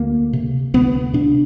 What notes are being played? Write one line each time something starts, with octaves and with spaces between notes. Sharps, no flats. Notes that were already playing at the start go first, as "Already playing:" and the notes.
Already playing: D2 A#3
C3
D2 B3
C3 D4